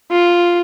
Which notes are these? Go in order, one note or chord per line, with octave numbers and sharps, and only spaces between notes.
F4